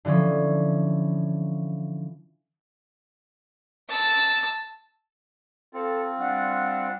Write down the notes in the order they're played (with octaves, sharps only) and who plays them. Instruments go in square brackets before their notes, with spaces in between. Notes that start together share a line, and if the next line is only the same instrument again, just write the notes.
[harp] D3 E3 F3 C#4
[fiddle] A5 E6
[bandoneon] C4 F4 [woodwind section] A4
[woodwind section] G3 D4 F#5